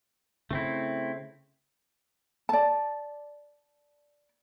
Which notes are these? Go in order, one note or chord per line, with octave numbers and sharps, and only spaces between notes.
C#3 A3 C4 E4
D5 A5